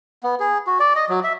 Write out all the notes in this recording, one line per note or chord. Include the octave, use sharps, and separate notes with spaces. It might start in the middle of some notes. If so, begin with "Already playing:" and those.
B3
G#4
F#4
D5
D#5
F#3
E5